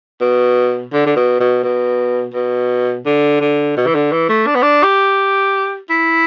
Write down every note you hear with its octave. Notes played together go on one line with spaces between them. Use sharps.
B2
D3
D3
B2
B2
B2
B2
D3
D3
B2
E3
D3
E3
A3
D4
B3
D4
G4
E4